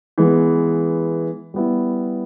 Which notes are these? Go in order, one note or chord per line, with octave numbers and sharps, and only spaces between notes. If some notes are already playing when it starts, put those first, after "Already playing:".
E3 G#3 B3
G3 B3 E4